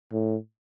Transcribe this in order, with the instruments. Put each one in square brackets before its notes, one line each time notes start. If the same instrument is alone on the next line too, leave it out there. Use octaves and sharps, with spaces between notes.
[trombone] A2